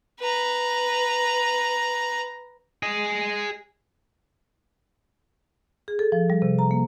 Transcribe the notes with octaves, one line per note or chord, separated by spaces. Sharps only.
B4 A#5
G#4 D#5
G#4
A4
F3
G3
C3
A#5
A#3